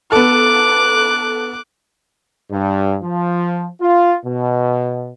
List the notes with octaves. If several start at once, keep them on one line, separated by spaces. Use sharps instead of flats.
B3 A4 D6 F#6
G2
F3
F4
B2